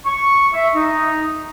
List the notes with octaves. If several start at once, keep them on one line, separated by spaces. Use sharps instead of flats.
C#6
E5
D#4